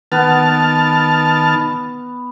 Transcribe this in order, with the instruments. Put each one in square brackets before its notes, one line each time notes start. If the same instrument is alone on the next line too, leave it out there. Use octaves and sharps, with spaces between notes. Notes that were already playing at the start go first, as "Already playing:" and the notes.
[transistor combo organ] D#3 A5 F6 [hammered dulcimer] B3